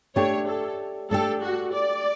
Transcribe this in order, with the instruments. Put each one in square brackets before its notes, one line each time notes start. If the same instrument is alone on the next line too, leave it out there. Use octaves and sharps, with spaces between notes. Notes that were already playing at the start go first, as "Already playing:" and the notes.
[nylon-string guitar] A3 D4 G4 [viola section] C#5
[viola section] A4
[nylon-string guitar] A3 D4 G4 [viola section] A4
[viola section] F#4
D5